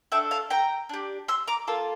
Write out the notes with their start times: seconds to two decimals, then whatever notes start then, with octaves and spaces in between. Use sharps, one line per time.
0.12 A3 D4 A4 E5 G5
0.31 F5 A5
0.50 G5 A#5
0.89 D4 G4
1.28 C6 E6
1.47 A#5 D6
1.67 A#3 F4 A4